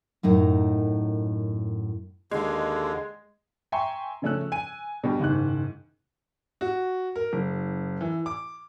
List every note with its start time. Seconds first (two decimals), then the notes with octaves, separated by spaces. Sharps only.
0.23 F#2 A2 D#4 A#4
2.31 D#2 D3 G#3
3.72 E5 G5 G#5 A#5 C6 C#6
4.22 C#3 F3 A3 C#4 E6 F#6
4.52 G#5 D#7
5.04 B2 D3 G3
5.20 F#1 G#2 D#3 F#6
6.61 F#4
7.16 A#4
7.33 F#1
8.01 E3
8.26 D6